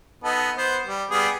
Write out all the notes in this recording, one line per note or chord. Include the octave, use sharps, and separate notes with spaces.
B3 D#4 A4
B3 C5
G3
G3 B3 G#4